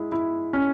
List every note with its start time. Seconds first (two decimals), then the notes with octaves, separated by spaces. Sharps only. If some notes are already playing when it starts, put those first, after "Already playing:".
Already playing: G#3 E4
0.12 E4
0.53 C#4